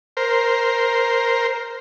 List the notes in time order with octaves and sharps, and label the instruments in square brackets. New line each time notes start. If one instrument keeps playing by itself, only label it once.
[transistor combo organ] A#4 C5